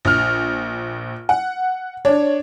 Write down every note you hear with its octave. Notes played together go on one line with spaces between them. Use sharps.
A#1 F6
F#5
D4 C#5